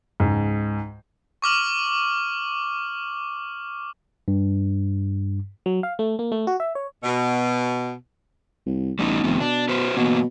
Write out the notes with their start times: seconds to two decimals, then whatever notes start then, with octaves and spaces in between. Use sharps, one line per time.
0.20 C#2 G#2
1.42 C#6 D6 F6 F#7
4.28 G2
5.66 F#3
5.83 F5
5.99 A3
6.19 A#3
6.32 A3
6.47 F#4
6.60 E5
6.75 C#5
7.04 B2
8.66 C2
8.99 A1 G3 B3 D#4
9.24 F1 D#3 B3
9.40 B2 D4
9.69 F#4 B4 C5
9.97 B2 E3 F#3 A#3